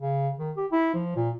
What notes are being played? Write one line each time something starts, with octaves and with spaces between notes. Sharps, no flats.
C#3
D#3
G4
E4
F3
A#2